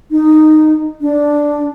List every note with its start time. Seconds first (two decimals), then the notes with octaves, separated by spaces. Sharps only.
0.11 D#4
1.01 D4